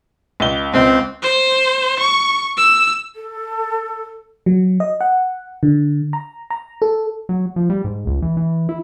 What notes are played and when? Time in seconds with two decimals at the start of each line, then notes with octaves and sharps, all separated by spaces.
0.40 C#2 G7
0.74 C#2 C4
1.22 C5
2.00 C#6
2.57 E6
3.16 A4
4.46 F#3
4.80 D#5
5.01 F#5
5.63 D3
6.13 A#5
6.50 A#5
6.82 A4
7.29 F#3
7.56 F3
7.70 G3
7.85 G#2
8.07 C#2
8.22 E3
8.37 E3
8.69 E4